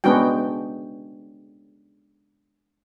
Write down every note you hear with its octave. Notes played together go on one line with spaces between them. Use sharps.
G#3 B3 C#4 D4 F#4 G5